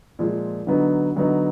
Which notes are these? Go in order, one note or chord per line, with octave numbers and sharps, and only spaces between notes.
A#2 F3 G#3
D3 F#3 B3 D#4
D3 F#3 B3 D#4